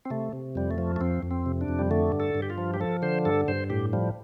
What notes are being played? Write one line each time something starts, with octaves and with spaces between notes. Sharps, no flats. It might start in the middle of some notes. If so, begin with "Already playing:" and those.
C4
C3 A3
C3
F2 G3
A3
F3
A3
F2 C4
F2
C4
C3
D4
F2
G3
D3 A3
G2
A4
G2
G4
F4
F3
G4
F3 A4
D3 C5
G2 A4
G2 C5
A2 G4
F3 G3